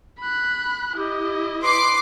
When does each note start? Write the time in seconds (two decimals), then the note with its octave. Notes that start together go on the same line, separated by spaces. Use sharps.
0.20 B5 F#6
0.97 E4 G4 D#5
1.63 B4 C6 D6 C7